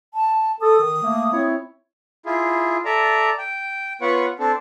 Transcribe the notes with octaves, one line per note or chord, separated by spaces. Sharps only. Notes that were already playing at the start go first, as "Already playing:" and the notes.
A5
A4 D#6
D#3
A3 A#3
C4 E4 C#5
E4 F4 G#4
A4 D5 E5 A#5
G5
B3 F4 B4 C#5 F#5 C#6
C4 D4 A4